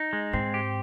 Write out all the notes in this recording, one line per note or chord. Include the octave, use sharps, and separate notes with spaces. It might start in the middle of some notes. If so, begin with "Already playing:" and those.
Already playing: D#4
G#3
G#2 C4
G4